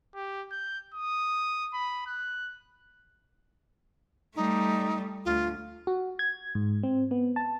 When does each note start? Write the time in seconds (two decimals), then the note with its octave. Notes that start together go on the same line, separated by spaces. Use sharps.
0.15 G4
0.51 G6
0.94 D#6
1.74 B5
2.07 F#6
4.36 G3 A3 D#4
5.25 D2 F4
5.87 F#4
6.19 G#6
6.55 G#2
6.83 C4
7.11 B3
7.36 A5